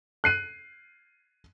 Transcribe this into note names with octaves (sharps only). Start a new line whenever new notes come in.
F#6 C7 D#7